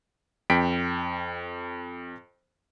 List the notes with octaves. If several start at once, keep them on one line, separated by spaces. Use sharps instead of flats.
F2 G5 B6 D7